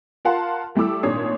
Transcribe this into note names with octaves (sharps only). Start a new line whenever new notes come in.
F4 A#4 F5 F#5 A5 C6
G3 A3 E4 D6 E6
G#1 A#2 D4 C#5 D#6 C7